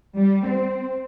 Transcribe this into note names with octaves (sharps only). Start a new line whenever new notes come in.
G3
C4